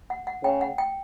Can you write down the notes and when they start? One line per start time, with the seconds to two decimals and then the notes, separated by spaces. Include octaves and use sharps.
0.10 F#5
0.27 F#5
0.44 C#3 G5
0.61 F#5
0.78 G5